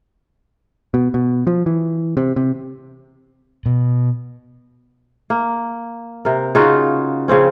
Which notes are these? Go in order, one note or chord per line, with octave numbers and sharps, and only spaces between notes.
B2
B2
F3
E3
C3
C3
B2
A#3
C3 A#4
C#3 D#4 F4 F#4
C#3 F3 C4 C#4